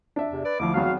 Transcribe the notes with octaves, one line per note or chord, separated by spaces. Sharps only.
D4 E5
E2 C3
B4 D5
D2 F3 E4 D6
G#1 F#3 B3 F#4 F5